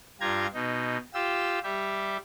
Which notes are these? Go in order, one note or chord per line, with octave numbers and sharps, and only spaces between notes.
G2 F4 G4 A#5 G#6
B2 D#4
F4 G4 E6
G3 G4 E5